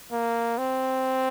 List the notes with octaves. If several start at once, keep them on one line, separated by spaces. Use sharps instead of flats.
A#3
C4